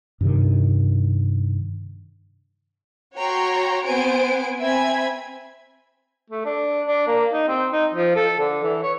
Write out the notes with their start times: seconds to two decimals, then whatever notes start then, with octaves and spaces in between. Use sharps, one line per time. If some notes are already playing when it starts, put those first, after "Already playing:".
0.21 G2 C3 D#3
3.15 F#4 C#5 G5 A#5 C6
3.84 B3 C4 C5 F#5 G#5 D7
4.60 C4 E5 G#5 B5 G#6
6.30 A3
6.45 D4
6.87 D4
7.07 A#3
7.33 D#4
7.48 C4
7.72 D#4
7.94 F3
8.16 A4
8.40 D3
8.64 E3
8.83 C#5